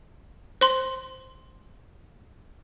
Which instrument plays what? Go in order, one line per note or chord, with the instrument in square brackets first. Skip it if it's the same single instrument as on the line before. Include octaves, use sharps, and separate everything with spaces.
[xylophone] C5 C6